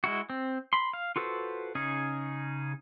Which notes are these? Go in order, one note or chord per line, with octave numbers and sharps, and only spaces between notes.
G#3 E4 F#4
C4
B5 C6
F5
F4 F#4 A4 B4 C5
C#3 C#4 D#4 G#4